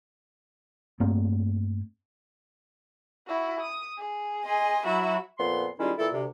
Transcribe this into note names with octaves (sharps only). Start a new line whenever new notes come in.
G2 A3 A#3 C4
E4 F#4
D#6
G#4
D#5 G#5 C6
F#3 E4 F#4 E5 B5
F2 A#2 B3 C6
D#3 G3 G#3 C#4 E4 F4
A#2 E3 E4 A4
D2 C3